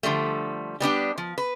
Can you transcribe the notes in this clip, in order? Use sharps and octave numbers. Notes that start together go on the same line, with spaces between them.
D3 F3 G3 A3
G3 B3 D4 G4
F3
B4